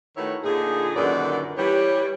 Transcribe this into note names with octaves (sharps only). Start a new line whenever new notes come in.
D#3 A3 E4 F#4 B4 C#5
A#2 D3 D#4 G#4
F#2 A#2 D3 D#3 B4 D5
E3 G3 G4 B4 C#5